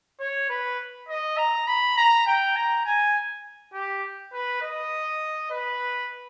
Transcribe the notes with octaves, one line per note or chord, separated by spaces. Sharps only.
C#5
B4
D#5
A#5
B5
A#5
G5
A#5
G#5
G4
B4
D#5
B4